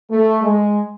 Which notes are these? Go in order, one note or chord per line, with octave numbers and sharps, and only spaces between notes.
A3
G#3